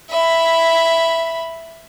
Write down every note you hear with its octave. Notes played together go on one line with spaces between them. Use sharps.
E5 B5